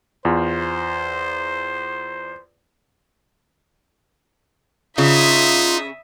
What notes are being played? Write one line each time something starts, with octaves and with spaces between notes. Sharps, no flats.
E2 F4 C5
C#3 D#4 F4 E5 D#6